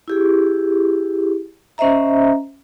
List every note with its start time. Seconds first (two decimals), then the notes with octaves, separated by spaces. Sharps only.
0.08 E4 G4 G#4
1.78 C#4 C5 D#5 E5 A#5